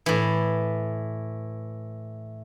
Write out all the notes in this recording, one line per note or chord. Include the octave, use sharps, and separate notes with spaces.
A2 E3